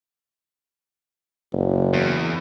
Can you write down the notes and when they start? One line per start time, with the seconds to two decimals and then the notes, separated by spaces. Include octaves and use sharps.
1.53 F#1
1.93 E2